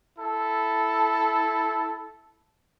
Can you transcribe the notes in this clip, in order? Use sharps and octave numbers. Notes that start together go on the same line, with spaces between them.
E4 A4